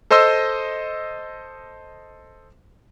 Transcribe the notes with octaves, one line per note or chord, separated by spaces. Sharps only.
A4 C5 D#5 C6 E6